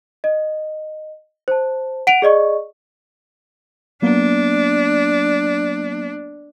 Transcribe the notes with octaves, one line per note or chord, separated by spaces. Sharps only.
D#5
C5 A5
F#5 D7 D#7 F7
G#4 D5 D#5 C#6
F#3 A#3 B3 D4